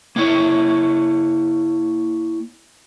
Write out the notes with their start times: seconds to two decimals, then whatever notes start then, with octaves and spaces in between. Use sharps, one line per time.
0.16 A#3 E4 C#5